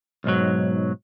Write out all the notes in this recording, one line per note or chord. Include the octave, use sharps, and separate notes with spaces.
B1 G#2 F#3